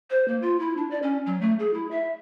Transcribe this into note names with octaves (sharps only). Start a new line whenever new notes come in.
C5
A#3
F4
E4
D4
D5
C#4
F#3
A3
G#4
E4
E5